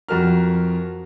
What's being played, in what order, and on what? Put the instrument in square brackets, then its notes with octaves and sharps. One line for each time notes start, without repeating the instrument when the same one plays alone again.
[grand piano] F2 F#4 A#4 F6